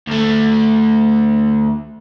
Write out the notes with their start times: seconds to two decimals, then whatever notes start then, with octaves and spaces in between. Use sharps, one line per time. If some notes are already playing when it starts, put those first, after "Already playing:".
0.07 D2 A3